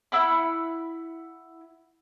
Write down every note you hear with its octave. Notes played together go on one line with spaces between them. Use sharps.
E4 F#5 B5